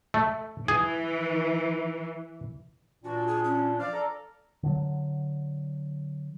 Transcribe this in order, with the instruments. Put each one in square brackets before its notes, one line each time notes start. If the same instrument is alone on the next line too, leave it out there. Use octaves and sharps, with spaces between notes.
[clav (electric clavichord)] A3
[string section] E3 [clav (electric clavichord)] G#4
[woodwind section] A#2 E3 D4 [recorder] F#4
[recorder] G#4
C#4
[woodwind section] F3 F5 F6 [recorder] D5
[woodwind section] A4 A#5
[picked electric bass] D3 F#3